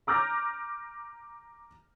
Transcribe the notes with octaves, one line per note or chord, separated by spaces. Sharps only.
A#5 D6 F6 G6 A#6